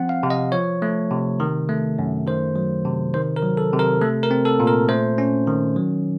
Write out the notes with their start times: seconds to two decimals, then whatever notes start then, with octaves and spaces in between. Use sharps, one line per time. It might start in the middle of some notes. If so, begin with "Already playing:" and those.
Already playing: F3 C4 F#5
0.09 F5
0.23 C3
0.30 D#5
0.52 F3 C#5
0.82 A3
1.11 C3
1.40 D#3
1.69 A3
1.99 F#2
2.27 D#3 C5
2.56 F#3
2.85 C3
3.14 D#3 C5
3.36 A#4
3.43 F#3
3.57 A4
3.73 C3
3.79 A#4
4.01 A3 A4
4.23 A#4
4.31 C4
4.45 A4
4.60 A#2
4.67 A#4
4.88 A3 C5
5.18 C#4
5.47 D#3
5.76 F#3